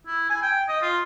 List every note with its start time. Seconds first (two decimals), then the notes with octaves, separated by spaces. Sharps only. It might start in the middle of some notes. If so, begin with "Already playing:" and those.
0.07 E4
0.30 G#5
0.43 G5
0.69 D#5
0.82 F4